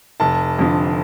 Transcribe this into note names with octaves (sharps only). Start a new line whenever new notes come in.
F1 A5
F2 D3